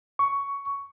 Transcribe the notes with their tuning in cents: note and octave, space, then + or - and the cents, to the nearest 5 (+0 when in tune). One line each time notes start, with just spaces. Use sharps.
C#6 +10